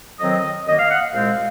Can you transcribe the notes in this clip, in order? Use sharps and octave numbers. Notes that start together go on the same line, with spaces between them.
F2 D#3 F#3 C4 D#5
F#2 D#3 A#3 D#5
F5
F#5
F5
C2 A#2 G#3 C4